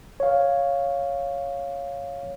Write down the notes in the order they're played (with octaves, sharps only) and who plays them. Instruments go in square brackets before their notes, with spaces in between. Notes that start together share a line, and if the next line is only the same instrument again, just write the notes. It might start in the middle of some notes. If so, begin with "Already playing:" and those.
[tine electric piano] C#5 F5